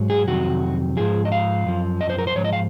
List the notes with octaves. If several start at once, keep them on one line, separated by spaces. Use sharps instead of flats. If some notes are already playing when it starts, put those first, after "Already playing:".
Already playing: G#2 F#3
G#4
F2 C3 D#3 F#3 F#4
G#2 F3 G#4
D#5
F5
F#2 F3
D#5
C5
A#4
C5
G#2 F3 C#5
D#5
F5